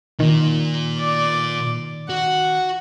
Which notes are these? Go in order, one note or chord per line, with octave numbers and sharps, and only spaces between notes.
A#2 D#3
D5
F#4 F#5